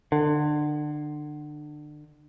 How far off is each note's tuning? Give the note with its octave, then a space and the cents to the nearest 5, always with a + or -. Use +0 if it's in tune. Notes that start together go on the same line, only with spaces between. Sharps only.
D3 +30